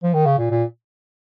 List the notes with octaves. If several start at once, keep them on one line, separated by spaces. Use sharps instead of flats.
F3
D#3
C#3
A#2
A#2